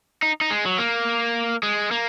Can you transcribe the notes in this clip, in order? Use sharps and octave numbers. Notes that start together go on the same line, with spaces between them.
D#4
D#4
G#3
F#3
A#3
G#3
A#3